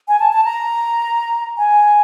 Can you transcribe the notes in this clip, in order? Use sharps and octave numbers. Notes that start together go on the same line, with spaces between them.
G#5
A5
A5
A#5
G#5